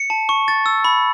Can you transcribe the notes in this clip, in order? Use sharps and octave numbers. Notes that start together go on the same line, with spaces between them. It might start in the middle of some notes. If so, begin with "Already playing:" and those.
Already playing: C#7
A5
C#6
A6
E6
B5